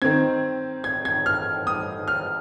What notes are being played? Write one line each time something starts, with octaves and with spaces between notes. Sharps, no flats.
D#3 C4 G#6
G#6
G#6
F6
D#6
F6